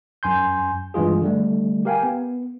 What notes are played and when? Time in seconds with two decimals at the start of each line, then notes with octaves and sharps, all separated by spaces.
0.23 F#2 G#5 C6 G6
0.94 G2 E3 G#3 F4 G#4
1.22 D3 G3 A3
1.85 G4 A#4 F5 G5 G#5
2.03 B3